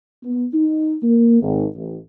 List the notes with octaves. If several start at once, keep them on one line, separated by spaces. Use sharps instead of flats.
B3
D#4
A#3
G#1
A1